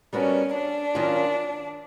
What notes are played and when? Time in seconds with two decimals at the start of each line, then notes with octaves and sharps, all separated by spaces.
0.12 G3 B3 C#4 D4 F#4 A#4
0.54 D4
0.95 D#3 F#3 A#3 C#4 F4